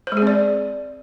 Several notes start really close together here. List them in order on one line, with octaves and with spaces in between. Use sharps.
C5 G#3 G#4 C4 D5